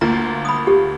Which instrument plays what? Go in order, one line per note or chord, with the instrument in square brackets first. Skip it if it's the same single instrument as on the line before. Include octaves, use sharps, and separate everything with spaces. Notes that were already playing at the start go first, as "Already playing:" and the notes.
[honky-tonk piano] D2 A#3 F4 [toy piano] A#5
[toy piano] B5 D#6
G4